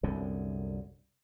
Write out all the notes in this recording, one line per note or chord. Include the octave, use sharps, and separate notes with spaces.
C2 F#2 D3